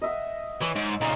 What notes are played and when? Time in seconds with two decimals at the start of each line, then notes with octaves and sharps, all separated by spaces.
0.01 D#5 E5 F#5
0.62 E3 C#5
0.76 G#2
1.01 A#2 C#3 D#4